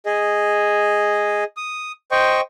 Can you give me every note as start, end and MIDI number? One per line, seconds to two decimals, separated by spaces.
0.06 1.44 68
0.06 1.44 75
1.57 1.92 87
2.11 2.41 72
2.11 2.41 75
2.11 2.41 79
2.11 2.41 85